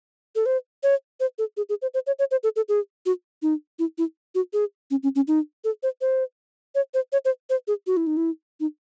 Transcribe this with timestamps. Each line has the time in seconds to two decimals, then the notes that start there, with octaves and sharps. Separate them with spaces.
0.36 A4
0.46 C5
0.83 C#5
1.20 C5
1.38 A4
1.57 G#4
1.69 G#4
1.82 C5
1.94 C5
2.07 C#5
2.19 C#5
2.31 C5
2.44 A4
2.56 A4
2.69 G#4
3.06 F#4
3.42 D#4
3.79 E4
3.98 E4
4.35 F#4
4.53 G#4
4.91 C#4
5.03 C#4
5.15 C#4
5.28 D#4
5.64 A4
5.83 C5
6.01 C5
6.75 C#5
6.94 C5
7.12 C#5
7.25 C5
7.50 C5
7.68 G#4
7.87 F#4
7.97 E4
8.07 D#4
8.17 E4
8.60 D#4